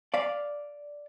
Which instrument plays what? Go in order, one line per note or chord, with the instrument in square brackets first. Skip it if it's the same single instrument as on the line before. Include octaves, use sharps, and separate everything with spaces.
[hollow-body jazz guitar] D5 F5